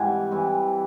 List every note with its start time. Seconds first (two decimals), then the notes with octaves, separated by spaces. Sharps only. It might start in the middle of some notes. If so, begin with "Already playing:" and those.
Already playing: G#2 E3 G3 C4 F#5 G#5
0.31 G#2 E3 G3 C4